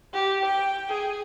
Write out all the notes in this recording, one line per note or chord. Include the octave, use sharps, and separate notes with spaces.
G4
G5
G#4